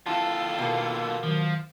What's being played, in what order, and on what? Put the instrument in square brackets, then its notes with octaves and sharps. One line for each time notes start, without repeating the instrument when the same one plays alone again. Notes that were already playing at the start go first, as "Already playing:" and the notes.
[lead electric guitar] D#2 A4 [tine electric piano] E4 A5 [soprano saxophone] F4
[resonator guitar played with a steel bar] B2 A#3
[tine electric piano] D#3 F#3 [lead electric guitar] F3